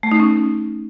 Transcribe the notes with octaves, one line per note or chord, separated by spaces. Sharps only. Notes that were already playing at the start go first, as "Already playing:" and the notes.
A3
D#4
C#4